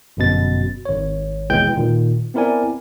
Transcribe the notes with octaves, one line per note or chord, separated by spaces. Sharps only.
G1 F#2 B2 A6
G#1 C#5
D#2 B2 E3 G#3 G5 G6
A#2 D#3
B3 C4 E4 A#4 D5 G#5